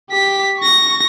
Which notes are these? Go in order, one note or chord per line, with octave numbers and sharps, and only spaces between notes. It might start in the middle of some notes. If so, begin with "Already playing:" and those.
G4 B6
C#6 A#6